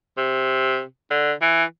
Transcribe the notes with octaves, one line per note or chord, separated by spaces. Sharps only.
C3
D3
E3